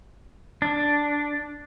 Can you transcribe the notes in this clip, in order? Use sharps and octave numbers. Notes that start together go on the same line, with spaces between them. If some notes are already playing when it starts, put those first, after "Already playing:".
D4